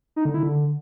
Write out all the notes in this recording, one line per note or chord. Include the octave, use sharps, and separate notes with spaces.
D#4
D3
E4
D3